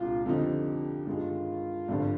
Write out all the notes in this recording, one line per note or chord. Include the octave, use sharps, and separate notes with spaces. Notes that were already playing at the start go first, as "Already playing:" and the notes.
Already playing: C2 A#2 G#3 D4 F4
F2 D3 F3 C4 D#4 G4
G2 D#3 G#3 F4
G#1 G2 D3 F3 C4